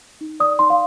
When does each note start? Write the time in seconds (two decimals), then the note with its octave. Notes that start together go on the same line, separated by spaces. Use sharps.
0.21 D#4
0.40 D5 D#6
0.59 D#4 C6
0.70 F5